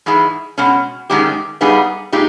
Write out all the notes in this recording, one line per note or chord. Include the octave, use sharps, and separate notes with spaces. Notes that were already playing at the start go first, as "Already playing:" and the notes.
G#2 E3 G#3
B2 G#3 C#4
G#2 D#3 G#3 C#4 G4
G2 G3 B3 D#4 G#4
A#2 G#3 D#4 G4